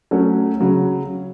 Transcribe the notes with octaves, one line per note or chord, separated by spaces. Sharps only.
F#3 A3 C#4
C#3 F#3